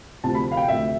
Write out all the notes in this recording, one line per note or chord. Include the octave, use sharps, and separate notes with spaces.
D2 C3 F3 A5
B5
F5
G5
D2 C3 F3 E5